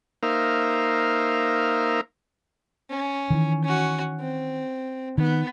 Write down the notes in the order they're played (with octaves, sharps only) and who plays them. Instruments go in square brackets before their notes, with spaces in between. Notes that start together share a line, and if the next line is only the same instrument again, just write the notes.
[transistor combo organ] A#3 D#4 A#4 C5 E5 F5
[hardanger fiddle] C#4
[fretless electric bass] D#3 E3
[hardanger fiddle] C#4 F#4
C4
[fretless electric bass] D#3 [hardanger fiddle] B3